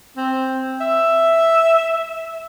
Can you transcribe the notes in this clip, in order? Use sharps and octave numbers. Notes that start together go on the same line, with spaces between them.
C4
E5